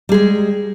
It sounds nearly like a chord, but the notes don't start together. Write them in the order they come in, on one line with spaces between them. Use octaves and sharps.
G3 G#4 G#3